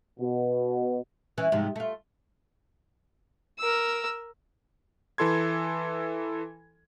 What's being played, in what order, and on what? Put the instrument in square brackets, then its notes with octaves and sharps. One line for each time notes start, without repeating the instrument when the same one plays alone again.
[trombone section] B2
[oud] E3 C#4
G#2 C3 F3
A3 F4
[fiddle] A#4 E6
[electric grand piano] E3 E4 A4 C6 G#6